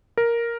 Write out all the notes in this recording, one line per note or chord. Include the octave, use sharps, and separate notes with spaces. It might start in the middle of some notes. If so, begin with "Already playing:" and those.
A#4